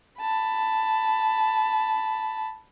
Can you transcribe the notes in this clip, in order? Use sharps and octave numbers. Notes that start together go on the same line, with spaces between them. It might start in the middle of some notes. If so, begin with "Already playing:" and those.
A5 B5